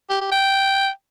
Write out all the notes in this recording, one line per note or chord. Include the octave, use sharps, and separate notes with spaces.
G4
G4
G5